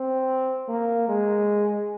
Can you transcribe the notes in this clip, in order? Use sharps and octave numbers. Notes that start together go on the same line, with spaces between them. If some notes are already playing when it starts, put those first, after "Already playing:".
Already playing: C4
A#3
G#3